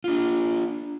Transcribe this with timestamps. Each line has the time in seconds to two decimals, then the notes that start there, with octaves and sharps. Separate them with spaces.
0.04 D4 F4